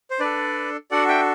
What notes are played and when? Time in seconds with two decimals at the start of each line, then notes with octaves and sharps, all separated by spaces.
0.11 C5
0.20 D4 A4 B4 D5
0.91 D4 F#4 A4 D5 F#5
1.08 E5 G5